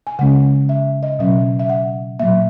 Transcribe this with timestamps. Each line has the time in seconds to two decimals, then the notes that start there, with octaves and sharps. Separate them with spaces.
0.07 G#5
0.19 C#3 G#3 C#4 F#5
0.69 E5
1.03 D#5
1.19 B2 F#3 C#4 E5
1.59 E5
1.69 F#5
2.20 A#2 F#3 A#3 E5